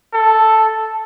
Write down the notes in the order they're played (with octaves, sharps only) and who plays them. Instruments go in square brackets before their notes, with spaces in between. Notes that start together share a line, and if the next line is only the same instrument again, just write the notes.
[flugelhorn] A4